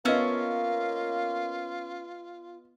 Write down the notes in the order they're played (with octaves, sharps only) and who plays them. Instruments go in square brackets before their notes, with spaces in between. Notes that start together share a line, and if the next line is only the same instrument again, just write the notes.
[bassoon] A#3 [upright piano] B3 D#5 [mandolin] C#4 E5 A5 [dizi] F4